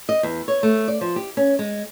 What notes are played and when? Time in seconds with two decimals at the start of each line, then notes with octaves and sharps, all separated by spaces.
0.09 D#5
0.23 E2
0.48 C#5
0.63 A3
0.88 D5
1.01 F3
1.16 G4
1.37 C#4
1.59 G#3